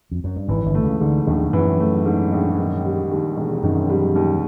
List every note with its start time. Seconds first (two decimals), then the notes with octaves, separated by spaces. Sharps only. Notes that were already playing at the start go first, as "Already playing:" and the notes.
0.11 F2
0.24 F#2
0.36 G2
0.48 G#1 G#2 E3
0.66 G1 G2
0.75 A3
0.83 C#2 C#3
1.00 D2 G#2 D3
1.27 A#1 D#2 D#3
1.53 F#2 E3 F#3
1.80 A3
2.05 G#2
2.32 A#1
2.58 D#3
2.84 G3
3.11 D#2
3.36 E1
3.63 F#2 D#3 F#3
3.89 G3
4.15 D#2